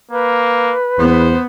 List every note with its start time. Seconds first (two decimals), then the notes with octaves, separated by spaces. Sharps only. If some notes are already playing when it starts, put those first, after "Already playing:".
0.11 A#3 B4
0.99 E2 B3 C5